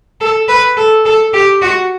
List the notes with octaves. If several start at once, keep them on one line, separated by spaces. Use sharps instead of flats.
A4
B4
A4
A4
G4
F#4